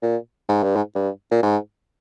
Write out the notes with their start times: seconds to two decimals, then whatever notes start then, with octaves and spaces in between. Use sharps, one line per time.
0.03 A#2
0.49 G#2
0.63 G2
0.76 G#2
0.95 G2
1.31 A#2
1.43 G#2